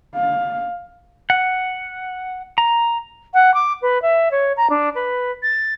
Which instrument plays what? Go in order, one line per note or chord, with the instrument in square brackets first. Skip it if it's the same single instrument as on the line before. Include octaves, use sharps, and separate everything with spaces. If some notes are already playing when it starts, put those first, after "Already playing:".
[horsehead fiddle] F5
[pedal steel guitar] F#5
A#5
[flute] F#5
D6
B4
E5
C#5
A#5
D4
B4
A6